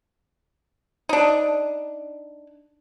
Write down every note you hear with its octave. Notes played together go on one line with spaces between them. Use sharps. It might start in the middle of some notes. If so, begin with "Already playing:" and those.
D4 D#4